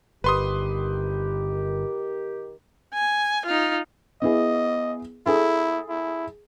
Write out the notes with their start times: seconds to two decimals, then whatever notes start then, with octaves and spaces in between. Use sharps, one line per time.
0.24 G1 D#3 G4 B4 C6 D#6
2.94 G#5
3.46 D#4 F4
4.22 B3 E4 G#4 D#5
5.26 E4 G#4 A4
5.89 E4